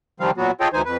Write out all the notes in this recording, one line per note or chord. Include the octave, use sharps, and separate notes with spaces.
C3 D#3 F3 G3 C4 F5
A#2 F#3 B3 F#4
F4 G#4 A4 C#5 D#5 G5
D2 E3 D#4 C5 G#5
F2 B4